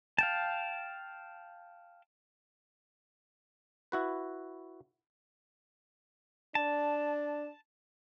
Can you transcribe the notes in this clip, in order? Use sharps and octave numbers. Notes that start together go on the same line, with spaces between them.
F5 G5 A5
E4 F#4 B4
D4 A5